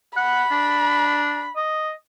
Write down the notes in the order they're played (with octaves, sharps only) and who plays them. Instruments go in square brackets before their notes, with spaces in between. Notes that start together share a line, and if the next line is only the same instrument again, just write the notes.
[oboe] F#5 [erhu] B5
[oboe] D4
D#5